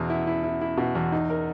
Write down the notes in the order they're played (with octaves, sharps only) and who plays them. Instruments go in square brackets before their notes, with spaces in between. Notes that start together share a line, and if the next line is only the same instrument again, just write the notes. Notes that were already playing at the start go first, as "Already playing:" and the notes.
Already playing: [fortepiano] E2 B2
E4
E4
E4
E4
B2
E2
D#4
A#4